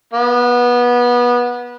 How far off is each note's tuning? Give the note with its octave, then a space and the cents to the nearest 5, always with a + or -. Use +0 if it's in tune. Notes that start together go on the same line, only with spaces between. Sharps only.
B3 -20